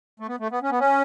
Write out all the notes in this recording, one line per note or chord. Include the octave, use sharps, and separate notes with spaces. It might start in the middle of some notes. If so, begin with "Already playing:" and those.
A3
B3
A3
B3
C#4
B3
C#4